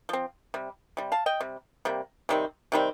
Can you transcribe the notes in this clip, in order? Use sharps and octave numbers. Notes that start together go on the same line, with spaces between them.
F3 C4
C3 G3
C3 G3
F5 A5
D#5 G5
C3 G3
C3 G3 A#3
C3 D#3 G3 C4
C3 D#3 G3 C4